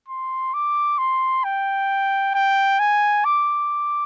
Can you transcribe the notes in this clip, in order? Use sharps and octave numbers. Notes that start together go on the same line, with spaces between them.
C6
D6
C6
G5
G5
G#5
D6